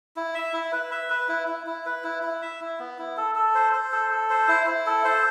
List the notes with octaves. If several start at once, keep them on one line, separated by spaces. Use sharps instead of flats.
E4
E5
E4
B4
E5
B4
E4
E4
E4
B4
E4
E4
E5
E4
B3
E4
A4
A4
C5
C5
A4
A4
C5
E4
E4
A4
C5